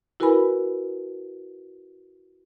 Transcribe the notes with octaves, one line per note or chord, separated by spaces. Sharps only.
E4 F#4 A#4 B4 G#5 B5